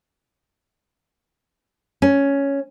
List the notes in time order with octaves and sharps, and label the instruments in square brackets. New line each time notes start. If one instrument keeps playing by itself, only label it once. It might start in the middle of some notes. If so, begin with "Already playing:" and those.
[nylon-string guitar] C#4